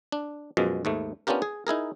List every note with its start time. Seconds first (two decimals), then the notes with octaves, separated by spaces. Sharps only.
0.12 D4
0.57 F#2 B2 F3 G#3
0.85 D#2 G#2 A3
1.27 B3 C#4 D4 F4 G4 A#4
1.42 G#4
1.67 D#4 E4 G#4 A#4